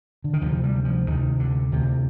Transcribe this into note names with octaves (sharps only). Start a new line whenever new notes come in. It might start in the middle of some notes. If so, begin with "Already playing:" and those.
D3
D#3
D2 C3 F3
G3
F3
D2 C3 D#3
D3
D2 C3